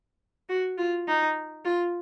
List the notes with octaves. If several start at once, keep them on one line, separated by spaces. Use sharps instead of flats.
F#4
F4
D#4
F4